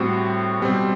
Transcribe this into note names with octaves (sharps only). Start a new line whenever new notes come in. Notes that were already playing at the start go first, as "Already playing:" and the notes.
Already playing: A2 G3 C4 F#4
B2 G3 C4